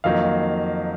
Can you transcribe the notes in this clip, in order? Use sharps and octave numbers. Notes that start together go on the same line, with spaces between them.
F2 D#3 F#3 A#3 F5